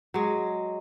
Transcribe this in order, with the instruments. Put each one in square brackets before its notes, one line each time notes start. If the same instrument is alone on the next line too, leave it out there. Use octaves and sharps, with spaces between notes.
[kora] F#3 G#3